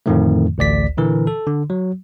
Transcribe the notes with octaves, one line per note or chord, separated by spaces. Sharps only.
F2 A2 D3 D#3 F3 A3
A1 D2 D5 B6
A#2 D3 E3 A#4
A4
D3
F#3